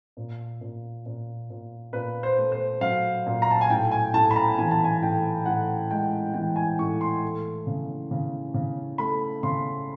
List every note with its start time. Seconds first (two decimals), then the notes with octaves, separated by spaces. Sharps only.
0.17 A#2
0.61 A#2
1.06 A#2
1.50 A#2
1.93 A#2 B4
2.23 C5
2.38 A3
2.52 C5
2.81 F#3 F5
3.26 A#2
3.42 A#5
3.51 A5
3.61 G#5
3.70 A2 G5
3.91 G#5
4.14 A2 A5
4.31 B5
4.36 A#5
4.58 E3 G#5
4.71 A5
4.84 G#5
5.02 A2 G5
5.46 A2 F#5
5.91 G#3 G5
6.34 E3 G5
6.56 G#5
6.79 A2 C#6
7.01 C6
7.23 A3
7.67 C#3
8.11 C#3
8.54 C#3
8.98 A3 B5
9.43 C#3 C6